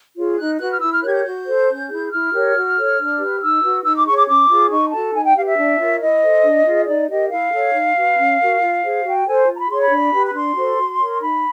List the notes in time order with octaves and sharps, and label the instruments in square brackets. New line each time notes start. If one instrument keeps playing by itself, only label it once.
[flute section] F4 G#4 C#5
D#4 F#6
F#4 B4 F#6
F6
E4 E6
F6
G4 A#4 C#5 F#6
G#6
G6
F#4 G6
A4 C5
C#4
E4 G#4
E4 F6
G4 A#4 C#5
F#4
A4 C#5
D4
G4 B4
D#4 E6
F#4 B4
D#4 E6
D6
G#4 C#5 C#6
D6
C#4 D6
F4 G#4 C#5
D#4 C#6
F#4 A4 A5
D#4 G#5
G5
G4 B4 F5
E5
D4
F4 A#4 C#5
E4 D#5
A4 C5
D4
F4 G#4
D#4 D5
G4 A#4 D#5
E4 F5
A4 C#5
D#4
F#4 B4
C#4
F#4 A#4
F4
G#4 C5
F#4 G5
A4 C5 G#5
F4 A#5
B5
G#4 C#5 C6
B5
D4
G4 B4
B5
D4 C6
F#4 A4 C5
F#4
A#4 C#5
D#4 B5